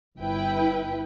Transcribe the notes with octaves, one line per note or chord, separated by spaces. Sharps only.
G1 E4 B4 G5